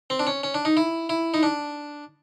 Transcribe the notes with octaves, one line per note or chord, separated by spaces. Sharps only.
C4
D4
C#4
C#4
D4
D#4
E4
E4
D#4
D4